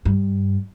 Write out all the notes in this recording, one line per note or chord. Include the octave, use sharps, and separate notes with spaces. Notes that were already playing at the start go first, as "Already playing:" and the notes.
G2